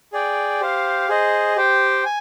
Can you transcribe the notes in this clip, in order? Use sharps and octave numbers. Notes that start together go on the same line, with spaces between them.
G#4 D5 G5
G4 C5 F5
G#4 C5 D#5
G4 C5 G5
G#5